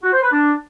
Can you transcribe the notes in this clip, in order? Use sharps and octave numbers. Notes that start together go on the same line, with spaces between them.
F#4
C5
B4
D4